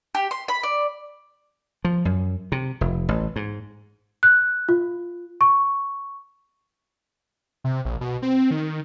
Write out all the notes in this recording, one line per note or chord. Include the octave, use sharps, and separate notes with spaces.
G4
C6
B5
D5
F3
F#2
C3
F1
A1
G#2
F#6
F4
C#6
C3
A#1
B2
C4
D#3